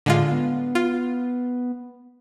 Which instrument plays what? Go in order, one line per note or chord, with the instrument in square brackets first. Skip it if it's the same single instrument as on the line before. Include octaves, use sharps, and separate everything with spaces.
[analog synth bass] A2 [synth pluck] D3 G#3 F4
[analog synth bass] B3
[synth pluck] F4